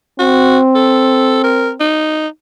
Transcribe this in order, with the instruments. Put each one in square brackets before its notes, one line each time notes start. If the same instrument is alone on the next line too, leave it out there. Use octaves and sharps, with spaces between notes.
[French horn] C4 [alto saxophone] F#4
[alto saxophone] A4
A#4
D#4